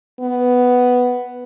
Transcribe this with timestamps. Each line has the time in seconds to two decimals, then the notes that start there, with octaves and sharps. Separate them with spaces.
0.20 B3